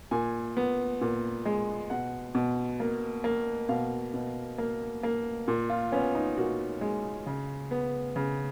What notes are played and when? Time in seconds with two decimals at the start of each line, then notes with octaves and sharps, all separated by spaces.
0.11 A#2 G#5
0.57 B3
1.01 A#2
1.46 G#3
1.90 B2 F#5
2.35 B2
2.80 A#3
3.24 A#3
3.69 B2 F5
4.14 B2
4.58 A#3
5.03 A#3
5.48 A#2
5.70 F4
5.92 B3 C#4
6.15 D#4
6.37 A#2 F#4
6.81 G#3
7.26 C#3
7.71 B3
8.16 C#3